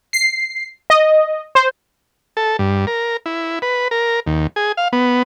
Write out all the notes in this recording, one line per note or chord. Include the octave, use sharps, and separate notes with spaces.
C7
D#5
C5
A4
G2
A#4
E4
B4
A#4
D#2
G#4
F5
B3